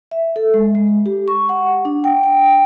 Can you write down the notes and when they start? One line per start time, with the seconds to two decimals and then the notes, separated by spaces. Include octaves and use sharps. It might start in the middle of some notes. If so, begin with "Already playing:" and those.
0.11 E5
0.36 A4
0.54 G#3
0.75 G#3
1.06 G4
1.28 C#6
1.49 F#5
1.85 D4
2.04 G5
2.23 G5